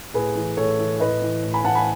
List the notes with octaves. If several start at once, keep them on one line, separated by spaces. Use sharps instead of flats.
A2 G#4 B4
E3
A2 A4 C#5
E3
A2 B4 D#5
E3
A2
G#5 B5
E3 F#5 A5
G#5 B5